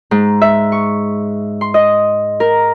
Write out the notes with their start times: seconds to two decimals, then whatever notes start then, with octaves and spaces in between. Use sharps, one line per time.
0.11 G#2
0.42 E5
0.72 C#6
1.61 C6
1.74 D#5
2.40 A#4